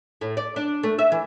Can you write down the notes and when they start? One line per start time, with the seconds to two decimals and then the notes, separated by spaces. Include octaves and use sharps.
0.21 A2
0.37 D5
0.56 D4
0.83 A3
0.99 E5
1.12 E3